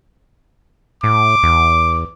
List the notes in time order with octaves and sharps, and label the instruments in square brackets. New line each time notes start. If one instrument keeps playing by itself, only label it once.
[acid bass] A2 [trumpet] D6
[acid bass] E2